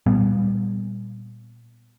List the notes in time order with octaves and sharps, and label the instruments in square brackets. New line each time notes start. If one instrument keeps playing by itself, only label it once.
[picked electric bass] A#2 G3 B3